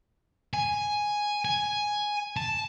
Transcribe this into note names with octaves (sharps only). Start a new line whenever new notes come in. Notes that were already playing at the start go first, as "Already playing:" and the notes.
G#5
G#5
A5